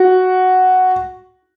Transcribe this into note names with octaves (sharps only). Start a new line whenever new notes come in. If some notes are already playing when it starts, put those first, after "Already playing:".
Already playing: F#4